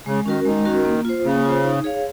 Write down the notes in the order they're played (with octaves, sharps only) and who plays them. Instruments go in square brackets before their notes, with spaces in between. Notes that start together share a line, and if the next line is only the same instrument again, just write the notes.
[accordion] C#3 [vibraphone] G#3
[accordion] D#3 [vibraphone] C#4 F#4 A#4
[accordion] D#3 [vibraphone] G#3
[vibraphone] C#4 F#4 A#4
A#3
F4 C5
[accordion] C#3 [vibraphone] A#3
[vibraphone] F4 C5
D#4
G#4 C#5 F5